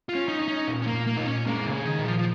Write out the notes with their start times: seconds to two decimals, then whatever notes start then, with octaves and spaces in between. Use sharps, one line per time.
0.09 F4
0.15 C#4
0.28 D#4
0.41 C#4
0.48 D#4
0.68 A#2
0.82 C#4
0.87 A#3
0.93 A#2
1.07 A#3
1.17 A#2 D#4
1.27 C#4
1.46 G#3 A#3
1.66 C#3
1.72 G#4
1.85 D#3
1.98 A#2
2.05 F3
2.18 F3